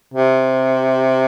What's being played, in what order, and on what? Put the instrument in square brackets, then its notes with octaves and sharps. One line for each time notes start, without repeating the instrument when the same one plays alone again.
[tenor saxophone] C3